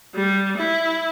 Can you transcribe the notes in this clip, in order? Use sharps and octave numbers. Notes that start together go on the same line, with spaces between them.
G3
E4